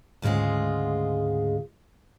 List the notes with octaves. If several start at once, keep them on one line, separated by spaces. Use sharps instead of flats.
D2 G#2 C#3 G#3 F4